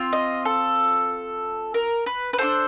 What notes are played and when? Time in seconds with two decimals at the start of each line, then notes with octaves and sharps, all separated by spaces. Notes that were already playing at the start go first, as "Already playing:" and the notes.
Already playing: C4 F4
0.13 D#5
0.45 A4
1.74 A#4
2.06 B4
2.33 B4
2.38 D4 F4 A4 C5